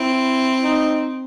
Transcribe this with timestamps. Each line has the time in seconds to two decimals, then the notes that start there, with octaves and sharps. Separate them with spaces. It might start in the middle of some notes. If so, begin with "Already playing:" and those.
Already playing: C4 E4
0.64 D#4